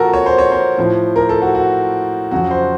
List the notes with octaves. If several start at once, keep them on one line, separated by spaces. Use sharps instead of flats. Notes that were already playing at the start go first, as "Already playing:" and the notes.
Already playing: A#2 F3 F#4 A4 A#4
C#5
C5
C#5
C5
A2 F3
A#4
A4
F#4
F#4
F2 C#3 F#3 F#4
C5